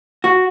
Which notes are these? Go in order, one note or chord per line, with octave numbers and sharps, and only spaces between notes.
F#4